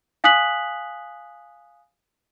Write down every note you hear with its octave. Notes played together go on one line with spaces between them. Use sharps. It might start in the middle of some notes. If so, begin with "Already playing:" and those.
F5 G#5 D#6 F#6 B6 F#7